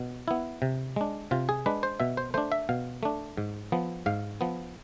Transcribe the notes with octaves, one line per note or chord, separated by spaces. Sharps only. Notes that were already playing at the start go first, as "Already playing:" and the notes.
Already playing: B2
B3 E4
C3
G#3 D4
C3 F4
G#4
G#3 D4 B4
C5
B2 E5
C5
A3 D4 C5
E5
B2 F5
A3 D4
G#2
F3 B3
G#2 F5
F3 B3